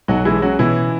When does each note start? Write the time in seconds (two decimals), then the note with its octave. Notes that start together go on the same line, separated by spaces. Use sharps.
0.08 B1 F#3 F#4
0.25 E3 G#3 E4
0.42 F#3 C#4 F#4
0.59 B2 E3 E4